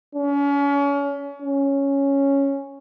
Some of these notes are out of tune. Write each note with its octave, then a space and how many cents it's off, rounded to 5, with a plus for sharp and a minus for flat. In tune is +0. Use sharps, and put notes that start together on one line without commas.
C#4 +35
C#4 +0